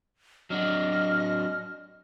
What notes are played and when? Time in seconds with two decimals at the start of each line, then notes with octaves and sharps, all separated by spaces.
0.50 F#3 D4 F#4 D#5 F6